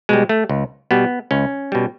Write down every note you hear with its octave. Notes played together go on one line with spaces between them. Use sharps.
B2 G3 G#3
A3
C#2
B2 G3 B3
C#2 C#4
B2 G3